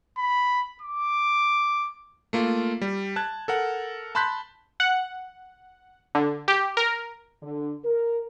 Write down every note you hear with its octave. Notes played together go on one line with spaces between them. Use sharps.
B5
D6
A3 A#3 F4
G3
A5 F#6 G#6
A4 A#4 F#5
A5 B5 C6 F#6 G6 B6
F#5
D3
G4
A#4
D3
A#4